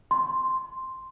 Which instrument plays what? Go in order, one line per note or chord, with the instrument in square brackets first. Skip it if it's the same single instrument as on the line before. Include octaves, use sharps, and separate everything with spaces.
[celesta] C6